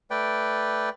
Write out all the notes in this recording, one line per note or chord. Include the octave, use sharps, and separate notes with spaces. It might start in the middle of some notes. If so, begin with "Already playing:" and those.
A3 B4 D5 G5